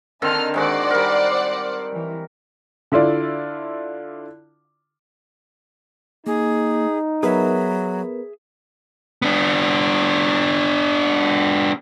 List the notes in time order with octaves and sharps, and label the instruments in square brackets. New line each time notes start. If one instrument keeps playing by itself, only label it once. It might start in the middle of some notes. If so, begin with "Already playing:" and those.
[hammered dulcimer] D3 D#3 C4 [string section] D#5 A5 F6
[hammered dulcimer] D#3 G#3 F#4 [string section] C5 D5 F#5
[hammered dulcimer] G3 A#4
[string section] E3
[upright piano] D3 E4 F4 D5
[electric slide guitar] A#3 [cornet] D#4 [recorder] G#4
[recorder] F#3 [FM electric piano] B3 A#4 B4 [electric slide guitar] G#4 E5
[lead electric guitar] B3 D4